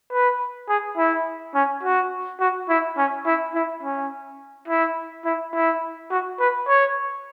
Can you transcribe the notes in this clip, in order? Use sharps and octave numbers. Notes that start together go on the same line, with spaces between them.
B4
G#4
E4
C#4
F#4
F#4
E4
C#4
E4
E4
C#4
E4
E4
E4
F#4
B4
C#5